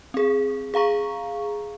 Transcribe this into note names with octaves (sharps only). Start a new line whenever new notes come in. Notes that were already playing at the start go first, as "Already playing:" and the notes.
C4 G#4
G#4 F5 A#5 C#6